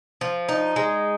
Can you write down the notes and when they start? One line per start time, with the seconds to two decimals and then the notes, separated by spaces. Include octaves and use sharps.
0.21 F3
0.49 D#4
0.76 G#3